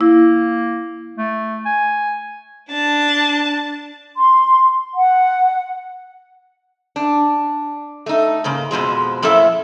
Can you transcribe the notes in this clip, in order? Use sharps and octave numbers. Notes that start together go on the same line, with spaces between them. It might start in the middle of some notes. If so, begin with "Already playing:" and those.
A#3 E4
A3
G#5
D4 A5
C6
F#5
D4
A3 D#4
G#2 C#3 A#3
F2 B2 F3 G#3
F#2 F3 A#3 E4 A4 E5